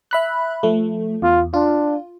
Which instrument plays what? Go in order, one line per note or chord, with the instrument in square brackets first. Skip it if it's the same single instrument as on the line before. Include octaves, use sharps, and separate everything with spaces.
[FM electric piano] E5 B5 F#6
F3 A3
[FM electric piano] E2 [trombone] F4
[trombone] D4 [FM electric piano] F4